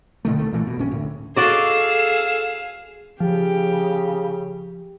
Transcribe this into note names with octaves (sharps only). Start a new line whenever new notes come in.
A#2 D3 D#3 A3
C2 A3
A#2 E3 A3
F1 B2
A#1 C#4
D2 A2
F#4 G#4 A4 D5 D#5 F5 E7
C#3 F3 G4